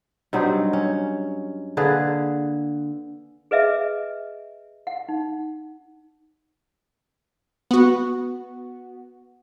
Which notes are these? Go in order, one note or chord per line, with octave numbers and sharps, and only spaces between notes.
G2 F#3 C4 D#4
C#4
D3 A#3 G#4 B4
G#4 B4 D#5 E5
F#5
D#4
B3 F#4